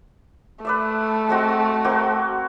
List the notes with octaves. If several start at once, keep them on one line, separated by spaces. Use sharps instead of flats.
A3 B4 D5 E5
G#3 C4 F#4
A#3 C4 F#4